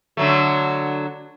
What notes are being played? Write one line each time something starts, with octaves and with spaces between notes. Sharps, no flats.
D3 F#3 A3